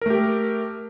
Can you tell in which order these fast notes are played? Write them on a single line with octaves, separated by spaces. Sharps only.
A#4 A3 G4